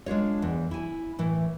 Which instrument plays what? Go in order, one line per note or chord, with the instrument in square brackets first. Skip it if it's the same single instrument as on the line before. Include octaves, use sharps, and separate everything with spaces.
[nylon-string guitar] G#3 D4 F4 C#5
E2
E4 G#5
A2 E3